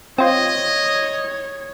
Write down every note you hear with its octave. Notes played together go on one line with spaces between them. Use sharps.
C4 F4 C#5 D#5